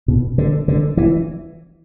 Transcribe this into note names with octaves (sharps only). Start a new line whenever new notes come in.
B2
D3
D3
E3